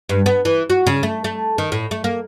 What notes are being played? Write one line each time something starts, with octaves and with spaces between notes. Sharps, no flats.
G2
B3
E3
F#4
C#3
A3
A3
D#3
A2
A3
A#3